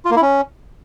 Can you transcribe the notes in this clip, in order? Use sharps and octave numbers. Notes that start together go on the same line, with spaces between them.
F4
A#3
E4
C#4